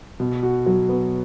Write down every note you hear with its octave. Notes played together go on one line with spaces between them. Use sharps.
B2
F#4
F#3
B3